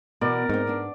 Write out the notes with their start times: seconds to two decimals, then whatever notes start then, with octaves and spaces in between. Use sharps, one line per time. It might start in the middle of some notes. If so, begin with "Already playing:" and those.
0.21 B2 E3 A#4 D5
0.49 G#2 C4 D#4
0.67 B3 D4